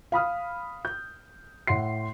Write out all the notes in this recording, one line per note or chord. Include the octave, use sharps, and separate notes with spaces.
F5 B5 D#6 F6
G6
A2 F#5 C6 C7